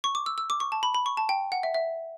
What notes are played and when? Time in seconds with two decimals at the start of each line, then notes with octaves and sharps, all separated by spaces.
0.04 C#6
0.15 D6
0.26 E6
0.38 E6
0.50 D6
0.60 C#6
0.72 A5
0.83 B5
0.94 B5
1.06 C#6
1.17 A5
1.29 G5
1.52 F#5
1.63 E5
1.74 E5